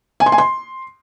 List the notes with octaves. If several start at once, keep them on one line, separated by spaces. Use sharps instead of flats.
G#5
C6
G#5
C6